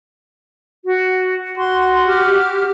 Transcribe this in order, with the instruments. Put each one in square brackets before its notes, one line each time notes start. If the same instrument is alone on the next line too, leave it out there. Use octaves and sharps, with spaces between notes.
[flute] F#4
[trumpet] F#4 [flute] C6
[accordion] G4 [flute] F6